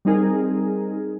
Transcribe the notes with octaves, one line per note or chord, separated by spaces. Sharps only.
G3 C4 D#4 G#4 A#4